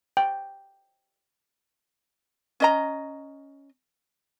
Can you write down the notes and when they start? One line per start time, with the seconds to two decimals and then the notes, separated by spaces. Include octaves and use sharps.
0.17 G5
2.60 C#4 D#5 A#5